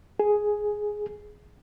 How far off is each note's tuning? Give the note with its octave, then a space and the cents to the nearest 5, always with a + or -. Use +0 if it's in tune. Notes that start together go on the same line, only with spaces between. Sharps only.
G#4 +5